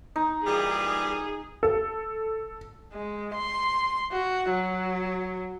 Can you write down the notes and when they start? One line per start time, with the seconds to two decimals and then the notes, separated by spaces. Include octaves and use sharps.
0.16 D#4
0.46 A#2 E3 G3 G#4
1.63 A4
2.93 G#3
3.34 C6
4.12 F#4
4.50 F#3